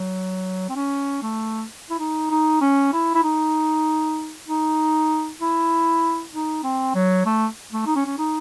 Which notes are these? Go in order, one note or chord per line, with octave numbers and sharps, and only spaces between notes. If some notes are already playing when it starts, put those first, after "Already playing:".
Already playing: F#3
C4
C#4
A3
E4
D#4
D#4
C#4
E4
E4
D#4
D#4
E4
D#4
C4
F#3
A3
A3
D#4
C#4
C#4
D#4